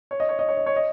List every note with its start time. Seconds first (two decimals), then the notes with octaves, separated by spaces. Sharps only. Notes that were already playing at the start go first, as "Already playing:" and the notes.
0.11 C#5
0.20 D#5
0.29 C#5
0.39 D#5
0.49 C#5
0.57 D#5
0.66 C#5
0.76 D#5